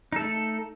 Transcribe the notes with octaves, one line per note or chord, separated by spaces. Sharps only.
A3 D#4 A4